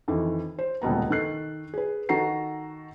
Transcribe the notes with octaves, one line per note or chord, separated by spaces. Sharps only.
F2 D#3 E3
C5
D#1 C#2 B2 B3 A#5
D#3 A4 F#6 C7
G#4 B4
D#3 F#4 A4 A#5 C7